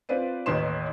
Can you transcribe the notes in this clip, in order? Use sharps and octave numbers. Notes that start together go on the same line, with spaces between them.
C4 F4 B4 C5 D5 D#7
A1 D#2 D#3 B4 C6 E7